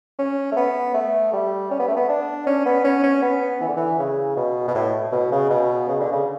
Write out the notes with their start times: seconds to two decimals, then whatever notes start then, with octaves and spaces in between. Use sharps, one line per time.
0.19 C#4
0.52 A3
0.56 B3
0.94 A3
1.33 G3
1.71 C#4
1.79 B3
1.88 A3
1.97 B3
2.09 D4
2.47 C#4
2.66 B3
2.85 C#4
3.03 C#4
3.22 B3
3.61 E3
3.68 D3
3.77 E3
3.98 C#3
4.37 B2
4.68 B2
4.75 A2
5.12 B2
5.32 C#3
5.50 B2
5.89 C#3
6.00 D3
6.12 C#3